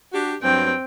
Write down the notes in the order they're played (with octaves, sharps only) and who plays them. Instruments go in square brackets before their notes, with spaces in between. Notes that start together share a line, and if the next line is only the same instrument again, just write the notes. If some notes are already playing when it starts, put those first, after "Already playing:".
[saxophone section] D4 F#4 G4
[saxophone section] G2 F#3 [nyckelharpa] C4 G5